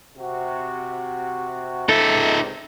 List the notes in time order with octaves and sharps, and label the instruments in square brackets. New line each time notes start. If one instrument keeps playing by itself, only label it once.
[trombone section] C3 F#4
[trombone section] C#2 C3 [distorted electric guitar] D#4 E5 [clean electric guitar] A4